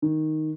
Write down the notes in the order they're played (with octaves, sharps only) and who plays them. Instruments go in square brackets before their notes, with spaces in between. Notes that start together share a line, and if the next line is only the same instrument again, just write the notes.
[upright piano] D#3